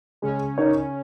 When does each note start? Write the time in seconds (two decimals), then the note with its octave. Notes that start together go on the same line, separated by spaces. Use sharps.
0.22 C#3 G#3 C#4
0.58 D#4 A#4 C#5